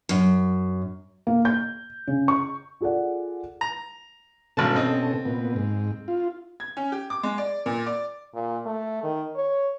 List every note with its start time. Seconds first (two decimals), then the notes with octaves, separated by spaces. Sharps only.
0.09 F#2
1.27 A#3
1.45 G6
2.08 C#3
2.28 C#6
2.81 F4 G#4 A4 D5 F#5
3.61 A#5
4.57 G#1 G2 B2 C#4 A4 A5
4.76 C4 D#5
5.25 A#2 B3
5.56 G#2
6.08 F4
6.60 G#6
6.77 C#4
6.92 G4
7.10 D6
7.23 G#3
7.38 D5
7.66 A#2
7.86 D5
8.34 A#2
8.66 A3
9.03 D#3
9.36 C#5